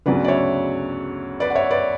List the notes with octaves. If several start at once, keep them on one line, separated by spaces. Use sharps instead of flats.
D2 C#3 F#3 B3 B4 D5
D5
C#5 E5
B4 D5
F#5
C#5 E5
B4 D5